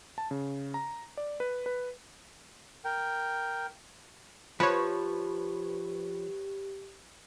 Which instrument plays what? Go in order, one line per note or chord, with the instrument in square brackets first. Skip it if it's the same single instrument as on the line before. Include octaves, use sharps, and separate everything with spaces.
[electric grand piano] A5
C#3
A#5
D5
B4
B4
[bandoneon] A#4 G5
[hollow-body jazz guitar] F3 [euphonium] G4 [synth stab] B4 C#5